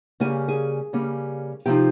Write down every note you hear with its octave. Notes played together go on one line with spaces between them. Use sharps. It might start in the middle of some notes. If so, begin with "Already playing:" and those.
C#3 G3 A#3 C#4 G#5
G#4 G#5
C#3 G3 A#3 C#4
C3 F3 C4 D#4 G4 G5